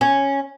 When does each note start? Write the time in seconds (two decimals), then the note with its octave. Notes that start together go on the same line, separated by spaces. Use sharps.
0.01 C#4